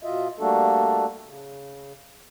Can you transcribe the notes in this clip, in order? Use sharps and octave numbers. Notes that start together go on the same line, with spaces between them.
B2 F4 D#5 E5
G3 A3 A#3 D4 F#4 A4
C#3